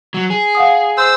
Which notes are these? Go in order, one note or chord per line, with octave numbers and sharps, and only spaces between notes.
F#3
G#4
F5 F#5 D#6
C5 E6